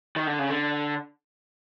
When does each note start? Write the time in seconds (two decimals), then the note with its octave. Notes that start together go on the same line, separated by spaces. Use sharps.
0.16 D#3
0.27 D3
0.39 C#3
0.50 D3